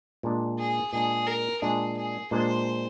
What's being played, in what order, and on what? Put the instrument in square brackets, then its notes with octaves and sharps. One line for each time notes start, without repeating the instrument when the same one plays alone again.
[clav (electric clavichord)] A#2 G#3 D4
[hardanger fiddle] G#4
[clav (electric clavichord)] A#2 G#3 D4 [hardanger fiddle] G#4
[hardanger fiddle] A#4
[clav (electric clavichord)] A#2 G#3 D4 [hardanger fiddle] G#4
[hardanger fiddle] G#4
[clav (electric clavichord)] A#2 G#3 D4 [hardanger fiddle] C5